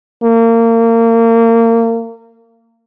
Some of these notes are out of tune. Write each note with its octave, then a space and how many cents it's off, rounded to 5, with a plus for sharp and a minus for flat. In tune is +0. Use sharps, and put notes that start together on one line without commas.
A#3 -30